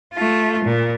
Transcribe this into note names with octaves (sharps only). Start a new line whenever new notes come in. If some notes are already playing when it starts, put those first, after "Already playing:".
A3 F4
A#2